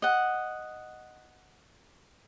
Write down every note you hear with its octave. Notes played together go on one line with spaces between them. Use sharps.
D#5 F#5